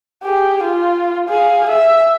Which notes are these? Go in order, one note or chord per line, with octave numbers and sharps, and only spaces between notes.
G4 G#4
F4
G#4 F5
E5